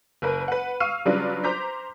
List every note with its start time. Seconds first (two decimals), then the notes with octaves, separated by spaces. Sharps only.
0.22 F#1 A#4 B4
0.48 B4 F#5
0.80 F5 C#6 E6 F6 C7 D#7
1.05 C#3 F#3 G3 D4 F4 B4
1.44 C5 A#5 D6 G6 B6